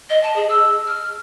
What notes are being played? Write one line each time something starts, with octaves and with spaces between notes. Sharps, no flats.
D#5
A5
G#4
E6
F6